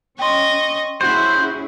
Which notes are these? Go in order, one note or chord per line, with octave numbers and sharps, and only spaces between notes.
C#4 D#5 G5 C6 C#6
C#4 E4 F#4 G#4 C5